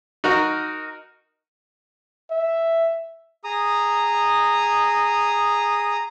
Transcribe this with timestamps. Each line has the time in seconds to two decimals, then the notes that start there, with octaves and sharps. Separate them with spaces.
0.24 D#4 F#4 A#4
2.31 E5
3.44 G#4 A#5 D#6